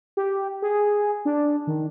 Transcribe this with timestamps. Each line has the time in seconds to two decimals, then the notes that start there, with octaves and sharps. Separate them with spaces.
0.17 G4
0.62 G#4
1.25 D4
1.67 D#3